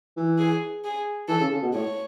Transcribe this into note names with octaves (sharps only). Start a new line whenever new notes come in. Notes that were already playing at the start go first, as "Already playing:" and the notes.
E3
G#4
G#4
E3 A4
C#3
C#3
B2
A2 C#5